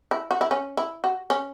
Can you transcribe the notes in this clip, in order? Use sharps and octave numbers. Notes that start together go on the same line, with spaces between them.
E4
F#4
E4
C#4
E4
F#4
C#4